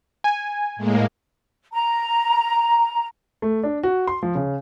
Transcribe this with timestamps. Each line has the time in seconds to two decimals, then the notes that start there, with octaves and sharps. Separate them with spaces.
0.24 G#5
0.76 A2 G#3 A#3
1.72 A#5
3.42 A3
3.63 D4
3.83 F#4
4.07 C6
4.23 F3
4.35 C#3